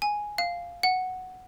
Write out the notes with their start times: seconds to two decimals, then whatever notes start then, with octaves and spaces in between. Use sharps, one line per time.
0.02 G#5
0.38 F5
0.83 F#5